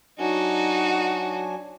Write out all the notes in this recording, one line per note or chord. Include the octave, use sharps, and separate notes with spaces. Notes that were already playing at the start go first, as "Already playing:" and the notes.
F#3 D4 D#4 F#4 G#5